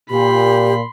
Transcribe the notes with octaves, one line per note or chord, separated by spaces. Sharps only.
A#2 G4 B5 C6